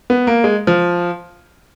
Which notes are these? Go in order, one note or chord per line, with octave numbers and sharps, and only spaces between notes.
B3
A#3
G#3
F3